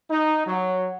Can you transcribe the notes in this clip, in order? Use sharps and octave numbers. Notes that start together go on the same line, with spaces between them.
D#4
F#3